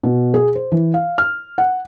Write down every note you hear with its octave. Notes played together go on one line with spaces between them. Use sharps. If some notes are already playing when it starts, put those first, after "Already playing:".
B2
G#4
C5
E3
F5
F6
F#5